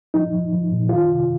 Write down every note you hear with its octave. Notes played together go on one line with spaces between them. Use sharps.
F3 D#4
F3
F3
A#2
D#3 F4
C3